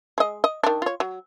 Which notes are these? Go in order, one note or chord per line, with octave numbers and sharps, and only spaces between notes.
G#3 D#5
D#5
D#3 D4
F4 C#5
F#3